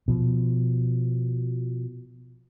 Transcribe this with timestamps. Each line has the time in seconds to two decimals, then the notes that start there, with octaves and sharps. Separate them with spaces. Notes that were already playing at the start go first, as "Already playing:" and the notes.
0.08 B2 F3